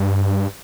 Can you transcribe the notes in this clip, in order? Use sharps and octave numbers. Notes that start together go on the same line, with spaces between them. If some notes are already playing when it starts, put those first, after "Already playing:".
Already playing: G2